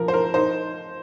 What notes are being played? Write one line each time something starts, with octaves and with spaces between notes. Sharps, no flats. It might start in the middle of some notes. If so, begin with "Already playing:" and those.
Already playing: F3 A#4
C5
A#4
D#4 C5